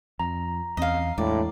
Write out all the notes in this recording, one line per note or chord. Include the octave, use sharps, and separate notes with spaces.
F2 A#5
E2 C4 C#4 D#5 F5
E2 A2 G#3 D4 D5